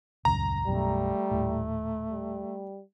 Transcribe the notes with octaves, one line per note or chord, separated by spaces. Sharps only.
D#1 C#2 F#2 A#5
B1 F#2 B2 G3 A3
D#1 A2
G3